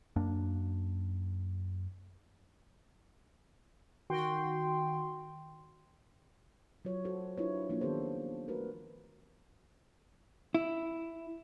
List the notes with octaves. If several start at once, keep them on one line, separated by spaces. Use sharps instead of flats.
F#2 A#3 D4
D#3 F#4 G5 C6
F#3 F4 C#5
F#4 A4 C5
D4 E4 F4 B4 C#5
F3 A#3 C#4 D4 E4 F4
D#3 B3 G4 A4 C5
A3 F#4 A#4 B4
E4